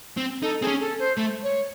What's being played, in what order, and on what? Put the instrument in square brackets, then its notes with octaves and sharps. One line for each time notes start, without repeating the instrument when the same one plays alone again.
[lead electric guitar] C4
[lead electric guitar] D#4 [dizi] A4
[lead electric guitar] C4 [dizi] G#4
[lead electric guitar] C#4
[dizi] A4
C5
[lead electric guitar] A3
[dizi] C#5